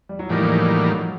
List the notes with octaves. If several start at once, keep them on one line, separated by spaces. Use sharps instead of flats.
G3
F#3
A2 E3 F3 G3 A#3 D#4
F3
F#3
F#3